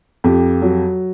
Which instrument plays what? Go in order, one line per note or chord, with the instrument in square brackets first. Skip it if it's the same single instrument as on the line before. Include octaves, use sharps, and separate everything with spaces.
[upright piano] F2 G4
F#3